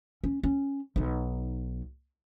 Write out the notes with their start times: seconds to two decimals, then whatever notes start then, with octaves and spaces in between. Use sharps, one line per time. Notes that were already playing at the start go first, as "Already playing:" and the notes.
0.24 C#4
0.43 C#4
0.96 B1 D#4